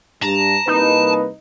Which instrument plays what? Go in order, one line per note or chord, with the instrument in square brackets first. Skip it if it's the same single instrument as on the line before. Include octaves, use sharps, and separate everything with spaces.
[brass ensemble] G2 [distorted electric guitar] A5 [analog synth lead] A#5
[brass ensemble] C2 A#3 B4 [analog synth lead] D#4